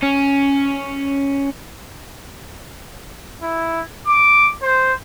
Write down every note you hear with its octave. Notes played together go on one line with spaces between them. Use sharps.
C#4
E4
D6
C5